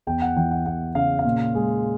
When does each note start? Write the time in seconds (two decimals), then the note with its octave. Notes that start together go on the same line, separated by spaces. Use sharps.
0.07 E2 G5
0.22 F#5
0.36 E3 G5
0.51 F#5
0.66 E2 F#5
0.95 C#3 F5
1.19 F5
1.25 A#2
1.55 G#3